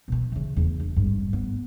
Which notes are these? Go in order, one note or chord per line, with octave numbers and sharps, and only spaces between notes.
B2 D#3
C#3 E3
E2 E3
D4
G#1 G2
B3